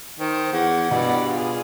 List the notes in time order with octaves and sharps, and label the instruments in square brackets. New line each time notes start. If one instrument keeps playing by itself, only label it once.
[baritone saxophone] D#3 [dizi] C5
[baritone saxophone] E2 [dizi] F#5
[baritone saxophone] G2 [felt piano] B2 [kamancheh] D5 B5
[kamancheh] F4 G#4